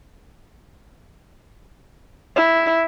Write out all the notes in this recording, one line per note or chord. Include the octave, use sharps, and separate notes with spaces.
E4